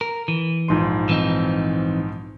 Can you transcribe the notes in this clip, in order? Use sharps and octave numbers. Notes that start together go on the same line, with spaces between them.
A#4
E3
A#1 G#2 C6
E3 C4 D#4